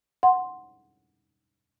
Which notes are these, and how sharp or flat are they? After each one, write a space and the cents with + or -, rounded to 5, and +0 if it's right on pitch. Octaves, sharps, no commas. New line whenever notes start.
F#5 -5 C6 +0